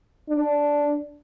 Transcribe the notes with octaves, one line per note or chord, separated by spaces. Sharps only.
D4